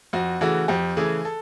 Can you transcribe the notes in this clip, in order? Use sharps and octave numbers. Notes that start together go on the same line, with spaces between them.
F2 F#4
C#3 E3 A3 F#4
F2 G4
C#3 E3 A3 G#4
A4